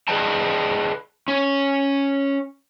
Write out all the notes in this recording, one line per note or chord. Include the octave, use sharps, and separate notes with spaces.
G#4 B4 D5 D#5 G5 A5
C#4